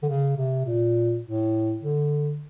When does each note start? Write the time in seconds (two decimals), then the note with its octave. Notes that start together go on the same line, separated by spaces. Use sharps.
0.03 D3
0.08 C#3
0.37 C3
0.65 A#2
1.23 A2
1.80 D3